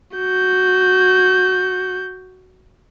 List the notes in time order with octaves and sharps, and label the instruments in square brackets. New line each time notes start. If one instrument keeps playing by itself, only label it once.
[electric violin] F#4 G6